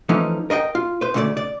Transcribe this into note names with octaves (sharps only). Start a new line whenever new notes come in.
E3 F3 A3 C#4 D#4
A#4 D#5 E5 G5
F4
B4 C5
D2 C#3 A3 B4 D5
D5